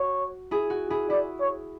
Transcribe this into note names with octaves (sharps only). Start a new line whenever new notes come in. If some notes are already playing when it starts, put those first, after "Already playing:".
Already playing: F#4 C#5
E4 G#4
F#4
E4 G#4
E4 D5
C#5